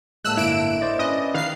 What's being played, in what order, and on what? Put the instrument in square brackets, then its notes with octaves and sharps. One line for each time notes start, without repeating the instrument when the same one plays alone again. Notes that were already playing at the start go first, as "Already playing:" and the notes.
[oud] A2 D3 A4 [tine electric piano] G#3 A#3 [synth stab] E6 F#6
[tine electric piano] G1 A#3 [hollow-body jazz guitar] E4 [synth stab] D7 E7
[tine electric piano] C5 D5 D#5
[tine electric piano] C#4 B4 D5 [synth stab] D#5
[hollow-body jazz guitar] D#3 B4 [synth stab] F5 C7